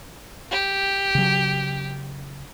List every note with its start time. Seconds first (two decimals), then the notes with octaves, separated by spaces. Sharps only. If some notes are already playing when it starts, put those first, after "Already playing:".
0.51 G4
1.15 C#3 F#3